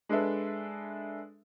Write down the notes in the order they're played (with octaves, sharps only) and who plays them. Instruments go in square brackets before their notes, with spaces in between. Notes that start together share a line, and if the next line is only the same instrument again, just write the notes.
[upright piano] G#3 D4 G#4 A4 B4 E5